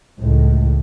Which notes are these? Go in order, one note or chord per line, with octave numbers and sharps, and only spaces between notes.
C#2 A2